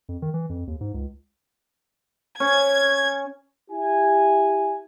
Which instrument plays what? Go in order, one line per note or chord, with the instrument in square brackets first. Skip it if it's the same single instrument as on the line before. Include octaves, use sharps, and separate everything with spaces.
[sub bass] F2
D#3
E3
F2
D#2
G#2
C#2
[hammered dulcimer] C#4 [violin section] G#6
[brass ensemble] E4 G4 G#5